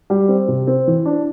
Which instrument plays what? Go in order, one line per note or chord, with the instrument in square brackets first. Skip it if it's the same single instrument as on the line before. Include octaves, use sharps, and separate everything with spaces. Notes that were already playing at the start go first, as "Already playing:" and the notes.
[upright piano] G3
C4
C3
C4
E3
D4